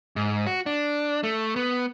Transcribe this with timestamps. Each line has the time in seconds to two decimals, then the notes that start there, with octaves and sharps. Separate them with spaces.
0.16 G#2
0.47 F#4
0.66 D4
1.23 A3
1.56 B3